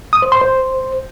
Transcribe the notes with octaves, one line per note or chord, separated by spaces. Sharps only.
D#6
C5
C6
C5